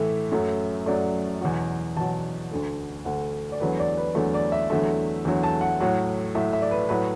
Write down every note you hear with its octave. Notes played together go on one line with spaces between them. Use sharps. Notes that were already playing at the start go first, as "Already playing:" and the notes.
Already playing: A2 E3 A3 E5
F#2 F#3 A3
F#2 F#3 A3 D5
E2 B2 F#3 F#5
E2 B2 F#3 A5
D2 D3 A3
D2 D3 A3 F#5
D5
E2 D3 F#3 A3 B4
D5
B4
E2 D3 F#3 A3
D5
E5
E2 D3 F#3 A3 E5
E2 D3 F#3 A3
A5
F#5
A2 F#3 A3 F#5
A2 F#3 A3 E5
E5
D5
B4
A2 F#3 A3 B4